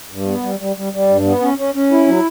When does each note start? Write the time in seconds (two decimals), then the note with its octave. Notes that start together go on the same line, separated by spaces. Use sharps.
0.11 G2
0.27 B3
0.43 G3
0.59 G3
0.76 G3
0.93 G3
1.09 G2
1.26 B3
1.42 C#4
1.58 C#4
1.75 C#4
1.91 E4
2.07 F#3